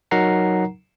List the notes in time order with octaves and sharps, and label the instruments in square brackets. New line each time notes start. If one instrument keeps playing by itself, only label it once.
[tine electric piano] F#3 D#4 A#4 F#5 A#5 C7